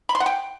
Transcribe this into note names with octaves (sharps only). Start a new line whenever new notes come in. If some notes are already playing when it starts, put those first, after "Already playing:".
B5
C6
F#5
G5